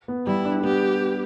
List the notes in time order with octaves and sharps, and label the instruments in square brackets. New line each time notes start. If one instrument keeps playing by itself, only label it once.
[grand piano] B3
[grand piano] G3 [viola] E4
[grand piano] D4
[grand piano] B3 [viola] G4